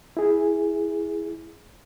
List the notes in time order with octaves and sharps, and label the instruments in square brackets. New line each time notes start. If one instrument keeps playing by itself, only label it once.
[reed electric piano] E4 G#4